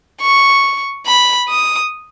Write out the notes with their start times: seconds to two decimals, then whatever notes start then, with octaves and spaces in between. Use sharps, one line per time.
0.21 C#6
1.06 B5
1.49 D#6